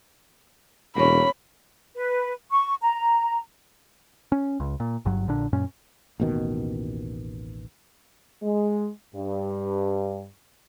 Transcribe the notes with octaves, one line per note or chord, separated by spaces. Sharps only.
E1 A#3 C#4 B5
B4
C#6
A#5
C#4
C#2
A#2
G1 G2 F#3
A#1 A#2 D3 D4
F#2 A#2 C#4
A1 D#2 B2 D#3
G#3
G2